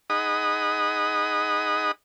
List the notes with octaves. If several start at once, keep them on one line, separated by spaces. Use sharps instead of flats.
D#4 G#4 D#5 F#5 B5 D#6